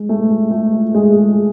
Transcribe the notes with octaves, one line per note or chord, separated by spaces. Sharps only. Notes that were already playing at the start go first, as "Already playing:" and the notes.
Already playing: G#3
A3
A3
G#3